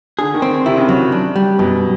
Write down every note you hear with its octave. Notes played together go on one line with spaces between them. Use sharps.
D3 G#4
D#3
C4
C3 E4
C#3
C#3 F#3
D4
G3
F#2 B2